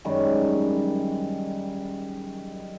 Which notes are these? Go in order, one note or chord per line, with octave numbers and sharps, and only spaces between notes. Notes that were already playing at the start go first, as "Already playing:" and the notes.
F#2 D#3 G3 G#3